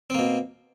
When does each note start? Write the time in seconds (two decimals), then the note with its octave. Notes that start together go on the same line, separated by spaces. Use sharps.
0.10 C4
0.14 A#3
0.19 B2